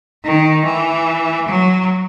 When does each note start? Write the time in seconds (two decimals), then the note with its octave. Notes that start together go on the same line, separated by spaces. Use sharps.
0.24 D#3
0.65 E3
1.48 F#3